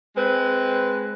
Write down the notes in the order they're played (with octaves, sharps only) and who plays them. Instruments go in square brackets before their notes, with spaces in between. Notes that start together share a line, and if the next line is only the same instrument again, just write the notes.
[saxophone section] G#3 C4 B4